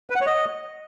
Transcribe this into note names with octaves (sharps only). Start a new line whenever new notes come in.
B4
F#5
C#5
D#5